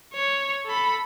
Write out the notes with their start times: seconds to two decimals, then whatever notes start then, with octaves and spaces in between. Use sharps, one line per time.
0.14 C#5
0.66 A4 B5